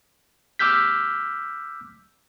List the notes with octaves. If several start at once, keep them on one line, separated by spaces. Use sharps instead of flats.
D6 E6 F6 G6 B6